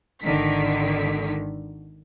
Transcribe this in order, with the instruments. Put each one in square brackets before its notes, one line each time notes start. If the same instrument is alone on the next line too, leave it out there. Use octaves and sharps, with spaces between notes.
[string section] G#1 D3 D#3 B6